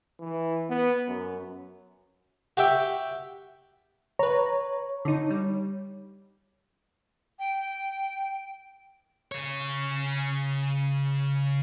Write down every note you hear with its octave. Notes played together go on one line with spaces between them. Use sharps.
E3
B3
F#2
F#4 G4 E5 G5
B4 C#5 A#5
D3 D#4
G3
G5
C#3 C#5